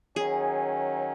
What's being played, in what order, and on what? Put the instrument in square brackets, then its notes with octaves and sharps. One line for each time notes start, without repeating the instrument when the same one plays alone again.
[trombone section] D#3 F#3 C#4 [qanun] G#4